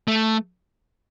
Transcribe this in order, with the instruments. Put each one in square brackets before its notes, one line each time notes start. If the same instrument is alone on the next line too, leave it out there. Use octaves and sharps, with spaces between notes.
[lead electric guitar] A3